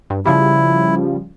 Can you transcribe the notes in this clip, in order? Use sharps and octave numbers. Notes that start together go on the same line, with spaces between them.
G2
C#3 F3 G3 E4